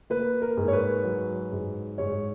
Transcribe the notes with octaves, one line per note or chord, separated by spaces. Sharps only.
A#3 B4
A#4
G#2
C#5
B4
F#3
G#2
G#2 C#5